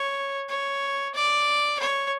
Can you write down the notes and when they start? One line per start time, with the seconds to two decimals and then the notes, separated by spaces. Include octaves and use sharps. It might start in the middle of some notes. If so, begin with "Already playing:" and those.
Already playing: C#5
0.49 C#5
1.15 D5
1.79 C#5